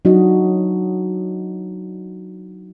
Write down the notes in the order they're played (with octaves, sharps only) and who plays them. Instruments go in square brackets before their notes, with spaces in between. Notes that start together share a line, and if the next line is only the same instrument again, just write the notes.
[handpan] F#3 D4 D#4 F#4 D#5